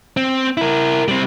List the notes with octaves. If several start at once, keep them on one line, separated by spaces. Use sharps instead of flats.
C4
E4 A#4
G3 C4